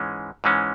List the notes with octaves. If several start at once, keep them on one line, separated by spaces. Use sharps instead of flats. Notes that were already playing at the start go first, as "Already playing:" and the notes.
Already playing: G#2 E3 G#3 C#4
G#2 E3 G#3 C#4